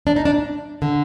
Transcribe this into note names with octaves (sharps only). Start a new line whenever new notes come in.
D4
D#4
D4
D3